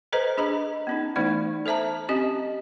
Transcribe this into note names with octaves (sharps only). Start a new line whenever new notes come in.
A4 B4 C5 D#5 A#5
D4 G#4 D#5 A#5
B3 C#4 D#4
E3 A3 B3 D#4 E4 D5
A4 C5 E5 A5 A#5
C4 C#4 G4 D#5